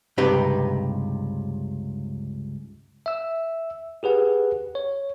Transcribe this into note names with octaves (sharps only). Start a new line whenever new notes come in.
C#2 G2 C3 D#4 G4 B4
E5 E6
G4 G#4 B4 F#5
C#5